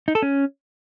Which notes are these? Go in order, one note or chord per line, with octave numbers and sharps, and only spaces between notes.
D#4
A4
C#4